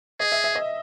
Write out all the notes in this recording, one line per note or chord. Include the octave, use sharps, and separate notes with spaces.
G#4 D#5
E5
E5
D#5